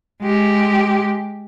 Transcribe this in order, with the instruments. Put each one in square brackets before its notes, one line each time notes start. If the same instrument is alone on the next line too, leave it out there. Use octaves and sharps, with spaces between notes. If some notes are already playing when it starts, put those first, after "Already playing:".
[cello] G#3 G4